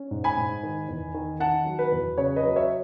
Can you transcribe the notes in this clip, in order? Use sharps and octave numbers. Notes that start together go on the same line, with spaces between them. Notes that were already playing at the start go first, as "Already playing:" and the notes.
Already playing: C#4
G#2
G#5 B5
G#2
D#3
E2
D#3
D#3 F#5 A5
F#3
B4
E2
C#3 C#5
B4 D#5
F#3
C#5 E5